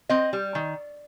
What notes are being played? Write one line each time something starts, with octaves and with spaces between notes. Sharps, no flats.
C4 D#5
G3
D#3